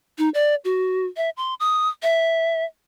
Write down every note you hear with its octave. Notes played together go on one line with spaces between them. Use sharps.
D#4
D5
F#4
E5
C6
D#6
E5